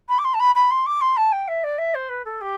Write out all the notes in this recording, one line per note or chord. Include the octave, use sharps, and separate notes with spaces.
B5
D6
C6
A5
B5
B5
C6
D6
C6
A5
G5
E5
D5
E5
C5
B4
A4
G4